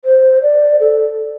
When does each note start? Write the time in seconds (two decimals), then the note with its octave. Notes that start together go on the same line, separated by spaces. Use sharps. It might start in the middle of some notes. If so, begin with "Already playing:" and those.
0.05 C5
0.42 D5
0.80 A4